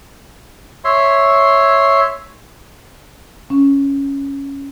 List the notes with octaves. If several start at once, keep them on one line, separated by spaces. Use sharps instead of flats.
C#5 E5 C6
C#4